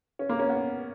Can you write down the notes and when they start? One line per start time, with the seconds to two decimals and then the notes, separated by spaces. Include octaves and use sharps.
0.19 C#4
0.29 A#3
0.39 C#4
0.50 B3